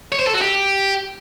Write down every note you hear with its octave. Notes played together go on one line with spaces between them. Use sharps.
C#5
C5
A4
F#4
G4